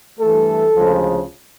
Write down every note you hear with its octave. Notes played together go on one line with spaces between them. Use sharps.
G2 E3 A3 A4
D2 C#3 F3 G#3